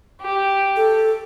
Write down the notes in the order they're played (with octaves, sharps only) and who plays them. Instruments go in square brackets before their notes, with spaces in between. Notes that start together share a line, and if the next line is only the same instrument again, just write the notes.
[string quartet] G4
[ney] A4